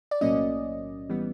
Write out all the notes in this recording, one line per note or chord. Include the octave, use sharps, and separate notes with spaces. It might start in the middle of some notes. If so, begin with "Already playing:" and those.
D5
B1 A2 F#3 A#3 C#4 D#5
E3 G3 B3